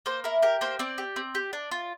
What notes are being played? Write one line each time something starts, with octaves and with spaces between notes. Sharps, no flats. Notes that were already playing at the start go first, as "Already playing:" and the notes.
A#3 C5
E4 A#4
G4 A#4
A#3 C5
C4 D5
G4
C4
G4
D4
F4